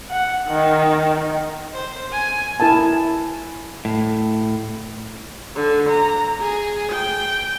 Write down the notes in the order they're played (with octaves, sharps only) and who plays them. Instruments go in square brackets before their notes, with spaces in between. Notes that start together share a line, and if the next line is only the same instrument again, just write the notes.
[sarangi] F#5
D#3
[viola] C5
G#5
[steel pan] E4 A#4 G#5 A5
[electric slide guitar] A2
[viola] D3
A#5
G#4
G5